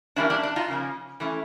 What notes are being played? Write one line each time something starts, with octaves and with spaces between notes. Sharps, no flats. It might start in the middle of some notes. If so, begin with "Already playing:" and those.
A2 E3 G3 A#3 D4 E4
D4
D4
D#4 F4
C#3 F3 A#3 C#4
E3 A3 C#4